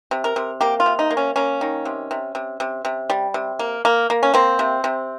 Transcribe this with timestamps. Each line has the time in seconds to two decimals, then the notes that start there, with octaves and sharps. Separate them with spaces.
0.11 C3
0.24 A#4
0.36 C3
0.61 A#3 G4
0.80 F4
0.86 C3
0.99 D#4
1.11 A#3
1.17 C#4
1.36 A#3 C#4
1.61 D#3
1.85 C3
2.11 C3
2.35 C3
2.60 C3
2.85 C3
3.10 G3
3.34 C3
3.59 A#3
3.85 A#3
4.10 A#3
4.23 C#4
4.34 A#3 C4
4.59 C3
4.84 C3